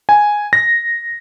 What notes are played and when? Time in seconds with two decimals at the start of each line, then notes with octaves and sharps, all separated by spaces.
0.09 G#5
0.53 A#6